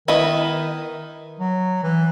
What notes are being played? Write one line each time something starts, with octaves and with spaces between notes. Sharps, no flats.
D#3 B3 E4 B4 D#5
F#3
E3